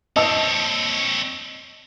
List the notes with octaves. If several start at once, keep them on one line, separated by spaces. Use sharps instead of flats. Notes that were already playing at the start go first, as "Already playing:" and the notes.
C4 C#5 D#5 A5 E6